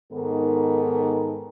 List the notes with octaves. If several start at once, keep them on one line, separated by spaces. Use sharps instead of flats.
G#2 D#3 B3 A4 A#4